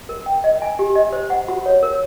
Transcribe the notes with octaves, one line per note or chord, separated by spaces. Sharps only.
A#4
G5
D#5
G#5
G4
D#5
C5
F#5
F#4
C#5
A#4